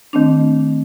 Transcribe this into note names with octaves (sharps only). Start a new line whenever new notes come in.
D#3 A3 C4 D4